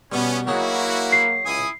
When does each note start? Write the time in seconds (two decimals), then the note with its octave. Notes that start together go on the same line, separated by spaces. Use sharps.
0.12 B2 G3 B3 C#4
0.47 F#3 A#3 D#4 E4 F#4 G#4
1.12 C7
1.45 C#2 E4 G#5 D#6